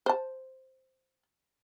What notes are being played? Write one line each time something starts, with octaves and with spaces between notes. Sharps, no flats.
C5 A5